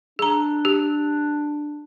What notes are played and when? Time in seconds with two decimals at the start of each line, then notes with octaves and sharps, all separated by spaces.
0.19 D4 G#4 A#5
0.65 G4